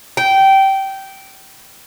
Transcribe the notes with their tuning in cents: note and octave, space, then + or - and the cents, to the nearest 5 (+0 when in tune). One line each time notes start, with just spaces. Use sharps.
G5 -15